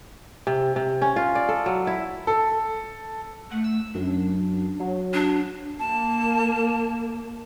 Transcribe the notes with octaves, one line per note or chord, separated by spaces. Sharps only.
C3
C3
C#4
F4
D5
A4
F#3
E4
A4
A3 F#5
E6
F#2 D4
F#3
D4
A#3 A5